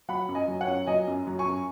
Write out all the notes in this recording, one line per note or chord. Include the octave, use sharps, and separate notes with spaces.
F#3 F#5 B5
F#2
D#5 G#5
F#3
C#5 F#5
F#2
F#3 D#5 G#5
F#2
F#3
G#5 C#6
F#2